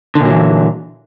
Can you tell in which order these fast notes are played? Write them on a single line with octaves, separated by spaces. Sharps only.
D3 A#2 F#3 E3